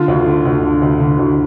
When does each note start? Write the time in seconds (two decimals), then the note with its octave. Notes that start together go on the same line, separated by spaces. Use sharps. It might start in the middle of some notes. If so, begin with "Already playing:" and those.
Already playing: D3 F4
0.08 D2
0.26 D3
0.45 D2
0.63 D3
0.82 D2
1.00 D3
1.19 D2